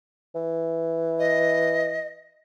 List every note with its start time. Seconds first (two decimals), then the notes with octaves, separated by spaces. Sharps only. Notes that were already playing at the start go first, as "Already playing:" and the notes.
0.35 E3
1.19 D#5